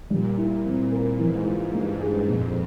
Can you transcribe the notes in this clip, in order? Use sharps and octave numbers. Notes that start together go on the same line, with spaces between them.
A#2 G3
E4
C4
A#4
G#2 E3
F4
G2 A#3
G#4
F2 A#2